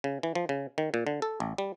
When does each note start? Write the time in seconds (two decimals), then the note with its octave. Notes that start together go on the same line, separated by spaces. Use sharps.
0.04 C#3
0.23 E3
0.35 F3
0.49 C#3
0.78 D#3
0.94 A#2
1.07 D3
1.22 A4
1.40 A1
1.58 G3